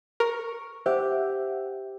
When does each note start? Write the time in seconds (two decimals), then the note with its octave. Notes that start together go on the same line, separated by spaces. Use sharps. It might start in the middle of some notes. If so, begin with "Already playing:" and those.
0.20 A#4 C#6
0.86 G4 C5 E5 F#5